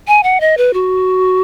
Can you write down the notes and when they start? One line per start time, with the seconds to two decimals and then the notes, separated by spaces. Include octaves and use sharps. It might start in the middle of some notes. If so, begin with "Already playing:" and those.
0.08 G#5
0.23 F#5
0.41 D#5
0.58 B4
0.74 F#4